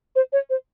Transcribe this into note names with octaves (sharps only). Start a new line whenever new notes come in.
C5
C#5
C5